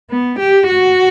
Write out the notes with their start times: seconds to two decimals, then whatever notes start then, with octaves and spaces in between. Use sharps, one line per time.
0.10 B3
0.39 G4
0.69 F#4